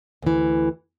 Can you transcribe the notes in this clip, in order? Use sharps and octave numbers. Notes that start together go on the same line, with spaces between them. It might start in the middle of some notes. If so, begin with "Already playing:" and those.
D2 E3